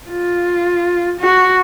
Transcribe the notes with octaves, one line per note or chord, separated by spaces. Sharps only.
F4
F#4